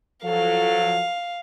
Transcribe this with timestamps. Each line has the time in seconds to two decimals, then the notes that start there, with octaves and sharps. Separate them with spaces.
0.23 F3 F#3 A4 F5